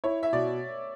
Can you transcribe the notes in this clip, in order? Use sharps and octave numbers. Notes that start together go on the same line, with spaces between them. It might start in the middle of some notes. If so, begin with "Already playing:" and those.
E4 C#5
E5
B2 D5